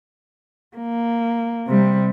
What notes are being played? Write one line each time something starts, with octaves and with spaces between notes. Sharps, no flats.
A#3
C3 G3